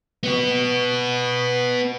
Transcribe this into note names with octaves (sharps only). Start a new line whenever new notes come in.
B3 F#4